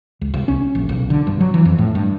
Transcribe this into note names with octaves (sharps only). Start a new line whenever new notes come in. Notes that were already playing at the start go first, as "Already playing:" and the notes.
C#2
C2
C#4
A#1
B1
D3
G2
F#3
E3
F2
A2
G2